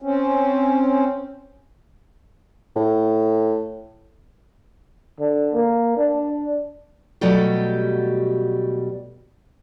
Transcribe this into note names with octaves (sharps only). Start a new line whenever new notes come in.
C4 C#4
A2
D3
A#3
D4
B2 F#3 G3 A3 G4